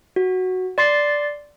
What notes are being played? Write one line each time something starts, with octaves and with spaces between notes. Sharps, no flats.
F#4
D5 C6 A6 C7